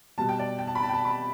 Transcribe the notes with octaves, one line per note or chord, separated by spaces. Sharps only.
B2 G3 A5
G5
D5
G5
A5
B5
A5
G5
A5
B5